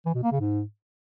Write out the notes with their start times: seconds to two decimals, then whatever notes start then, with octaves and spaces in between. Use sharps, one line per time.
0.06 E3
0.14 B2
0.23 A#3
0.32 C#3
0.40 G#2